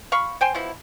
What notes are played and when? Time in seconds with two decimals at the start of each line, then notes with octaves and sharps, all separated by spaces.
0.12 F5 B5 C#6
0.41 C5 G5 G#5 C6
0.55 B2 F3 E4